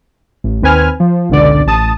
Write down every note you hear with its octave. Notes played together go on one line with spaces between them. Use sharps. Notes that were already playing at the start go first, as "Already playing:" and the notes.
A1
D#2 C4 B4 G#5 F6
F3
G#1 C#2 B2 D3 D5
A1 A5 D#6